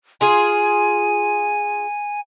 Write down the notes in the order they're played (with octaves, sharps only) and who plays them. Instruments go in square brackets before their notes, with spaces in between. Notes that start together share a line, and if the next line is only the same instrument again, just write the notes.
[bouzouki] F4 G#4 [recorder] G#5